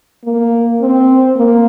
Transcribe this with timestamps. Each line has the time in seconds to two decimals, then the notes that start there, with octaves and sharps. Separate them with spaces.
0.24 A#3
0.81 C4
1.36 A#3